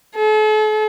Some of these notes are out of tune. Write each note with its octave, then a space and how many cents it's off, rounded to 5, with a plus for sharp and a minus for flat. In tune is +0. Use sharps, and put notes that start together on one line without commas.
A4 -45